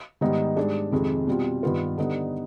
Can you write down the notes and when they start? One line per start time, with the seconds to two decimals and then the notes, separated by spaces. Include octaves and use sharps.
0.21 G#2 D#3 G3 B3 D#4
0.56 G#2 G3 D4 G#4
0.92 F2 C3 D#3 G#3
1.27 B2 G3 C4 F4
1.63 G2 D#3 B3 F4 B4
1.98 D3 G3 B3 D#4